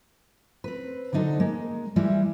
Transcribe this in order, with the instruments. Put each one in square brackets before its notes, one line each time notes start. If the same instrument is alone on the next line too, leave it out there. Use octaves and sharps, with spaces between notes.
[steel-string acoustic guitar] C4 B4
D3 F#3 D4 D#4 A4 C5
G#3 A#3
E3 G3 G#3 E4 G4